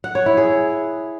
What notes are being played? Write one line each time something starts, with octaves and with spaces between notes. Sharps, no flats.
F#5
C#5
E4
G#4